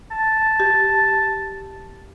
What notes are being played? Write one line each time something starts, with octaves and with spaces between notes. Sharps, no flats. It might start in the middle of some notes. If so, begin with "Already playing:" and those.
A5
G4